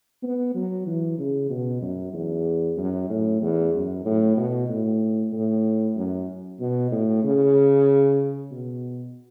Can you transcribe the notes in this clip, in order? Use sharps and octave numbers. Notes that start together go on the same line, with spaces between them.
B3
F#3
E3
C#3
B2
F#2
E2
F#2
A2
E2
F#2
A2
B2
A2
A2
F#2
B2
A2
C#3
B2